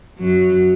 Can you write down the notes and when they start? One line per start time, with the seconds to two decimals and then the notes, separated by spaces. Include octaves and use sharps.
0.18 F#2 F#3